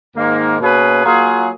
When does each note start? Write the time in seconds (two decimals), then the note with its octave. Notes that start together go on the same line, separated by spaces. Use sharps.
0.15 G#2 D#3 A#3
0.60 B2 A#3 C#4 G#4 B4
1.05 F#3 A#3 F4 G#4